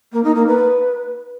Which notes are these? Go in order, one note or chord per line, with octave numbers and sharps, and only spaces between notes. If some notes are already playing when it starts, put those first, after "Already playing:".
A#3
D#4
A#3
B4